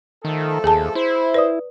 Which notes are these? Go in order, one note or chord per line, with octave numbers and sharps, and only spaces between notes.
D#3 F3 A3 A4
D#2 G#4 G#5 A5
E4 C5
B4 D5 D#6